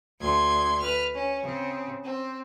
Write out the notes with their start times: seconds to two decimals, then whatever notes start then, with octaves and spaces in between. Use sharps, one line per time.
0.20 D2 C6 G#6
0.79 B4 F6
1.14 C#4
1.43 C#3 C4
2.04 C4